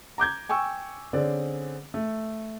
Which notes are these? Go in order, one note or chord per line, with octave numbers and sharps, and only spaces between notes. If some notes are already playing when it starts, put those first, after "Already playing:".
A#5 D6 G6 G#6
G5 G#5 C#6 E6
D3 C4 C#4 G#4 D5
A3